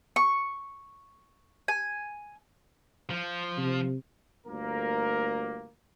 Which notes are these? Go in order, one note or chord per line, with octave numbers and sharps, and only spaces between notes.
C#6
G#5
F3
C3
G1 D2 A#3 A#4